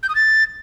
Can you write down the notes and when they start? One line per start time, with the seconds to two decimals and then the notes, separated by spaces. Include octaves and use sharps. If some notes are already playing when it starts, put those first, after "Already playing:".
0.03 G6
0.09 D#6
0.15 A6